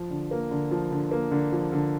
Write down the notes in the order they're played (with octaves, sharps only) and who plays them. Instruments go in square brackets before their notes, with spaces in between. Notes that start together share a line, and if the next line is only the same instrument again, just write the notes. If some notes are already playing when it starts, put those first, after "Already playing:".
Already playing: [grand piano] F3
D3
A#3
D3
F3
D3
A#3
D3
F3
D3